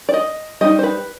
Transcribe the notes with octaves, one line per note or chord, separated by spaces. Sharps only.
D5
D#5
G3 C4 D#4 D#5
C5
B4